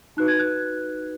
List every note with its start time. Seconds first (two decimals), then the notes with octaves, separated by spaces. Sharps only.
0.17 D#4 F#4 B4 F#6
0.28 G#6
0.39 F#6